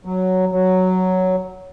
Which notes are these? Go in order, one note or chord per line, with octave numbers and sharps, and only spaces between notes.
F#3
F#3